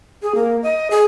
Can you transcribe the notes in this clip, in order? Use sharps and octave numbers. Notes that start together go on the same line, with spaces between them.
G#4
A#3
D#5
G#4